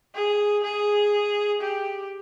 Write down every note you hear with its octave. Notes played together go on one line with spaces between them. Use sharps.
G#4
G#4
G4